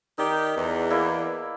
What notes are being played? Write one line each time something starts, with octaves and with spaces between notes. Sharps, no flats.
D#3 D#4 G4 D5
E2
A#3 E4 D5